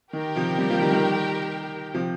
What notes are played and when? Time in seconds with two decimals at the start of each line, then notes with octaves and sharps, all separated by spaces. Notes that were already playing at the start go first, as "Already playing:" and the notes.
0.13 D#3 G4 A#4 G5
0.36 C3 F3
0.58 G3 C4
0.70 F3 A#3
0.81 D#3 G3
0.92 D#3 G3
1.94 C3 F3